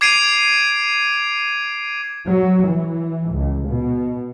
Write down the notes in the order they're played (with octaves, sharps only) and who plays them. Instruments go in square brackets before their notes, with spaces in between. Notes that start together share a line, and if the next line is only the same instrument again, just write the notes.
[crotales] D6 G#6 C7 D7 D#7 F7
[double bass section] F#3
E3
C#2
B2